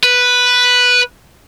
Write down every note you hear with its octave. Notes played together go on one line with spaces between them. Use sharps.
B4